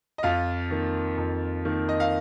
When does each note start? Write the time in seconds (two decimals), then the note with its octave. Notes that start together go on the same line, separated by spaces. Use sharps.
0.18 D#5
0.23 F2 F4 F5
0.71 D#3 A#3
1.17 F2
1.65 D#3 A#3
1.89 D#5
2.00 F5